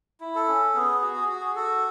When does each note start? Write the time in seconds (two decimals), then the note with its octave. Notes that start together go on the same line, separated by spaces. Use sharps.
0.20 E4
0.35 A4
0.48 C#4
0.74 B3 G#4
1.02 F#4
1.16 G#4
1.28 F#4
1.41 G#4
1.55 F#4 A4